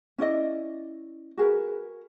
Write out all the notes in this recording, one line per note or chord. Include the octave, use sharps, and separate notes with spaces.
C#4 E4 D5 D#5
F#4 G#4 A#4 B4